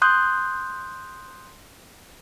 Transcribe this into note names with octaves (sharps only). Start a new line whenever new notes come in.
C6 D#6 F#6 G6